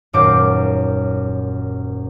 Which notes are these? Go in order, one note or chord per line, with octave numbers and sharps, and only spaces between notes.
D#1 F#2 F5 D6 G6 D7